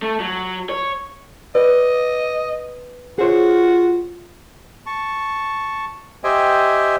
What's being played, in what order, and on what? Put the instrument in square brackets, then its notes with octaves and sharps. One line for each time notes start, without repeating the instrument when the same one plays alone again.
[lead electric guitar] A3
F#3
C#5
[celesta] B4 [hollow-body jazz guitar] D5 [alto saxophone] D#5
[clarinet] F4 [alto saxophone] F#4 [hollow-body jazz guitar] G#4 C5 C#5
[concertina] A5 C#6
G4 C5 D#5 E5 G5 G#5